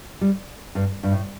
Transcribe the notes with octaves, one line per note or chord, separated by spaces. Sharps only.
G3
G2
G2
A2